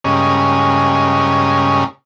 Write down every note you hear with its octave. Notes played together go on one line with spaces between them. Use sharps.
G2 C#3 G#3 A#3 C#4 D#5